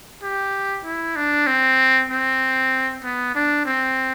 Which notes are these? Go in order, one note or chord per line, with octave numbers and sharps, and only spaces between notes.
G4
E4
D4
C4
C4
B3
D4
C4